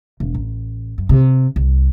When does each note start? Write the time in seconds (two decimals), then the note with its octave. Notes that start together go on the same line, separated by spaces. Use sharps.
0.20 E1
0.35 A1
0.98 F#2
1.09 C3
1.56 C2